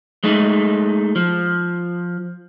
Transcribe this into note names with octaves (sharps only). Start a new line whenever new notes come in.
G#3 A3 D#4
F3